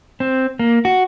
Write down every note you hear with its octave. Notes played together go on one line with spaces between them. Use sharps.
C4
A#3
F#4